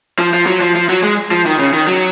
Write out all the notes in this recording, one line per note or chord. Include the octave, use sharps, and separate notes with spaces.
F3
F3
F#3
F3
F3
F#3
G#3
F3
D#3
C#3
D#3
F#3